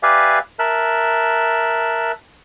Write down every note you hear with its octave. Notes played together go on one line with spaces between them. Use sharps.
G4 B4 D5 E5 F5 G#5
A#4 E5 A5 F#6